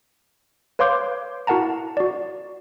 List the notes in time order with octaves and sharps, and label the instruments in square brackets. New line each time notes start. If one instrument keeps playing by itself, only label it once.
[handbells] B4 C#5 F5 C6 D6 G6
E4 F#4 A#4 F#5 A5 A#5
F#4 D5